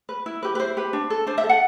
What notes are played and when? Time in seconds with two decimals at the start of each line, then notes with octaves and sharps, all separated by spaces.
0.09 B4
0.26 E4
0.43 G4 B4
0.55 B4
0.60 E4 C5
0.77 G4 B4
0.93 D4
1.10 A4
1.27 D4 C5
1.38 E5
1.43 A4
1.49 F#5